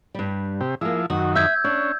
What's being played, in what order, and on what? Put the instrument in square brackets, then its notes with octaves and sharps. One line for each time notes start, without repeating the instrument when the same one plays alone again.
[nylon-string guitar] G2 G3
[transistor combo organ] C3 G4
[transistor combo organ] F3 E4 [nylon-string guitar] A#3 G#4
[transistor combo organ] F#2 D#3 [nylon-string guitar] F#4
[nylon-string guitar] E5 [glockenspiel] E6 G6 G#6
[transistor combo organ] C#4 [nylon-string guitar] D4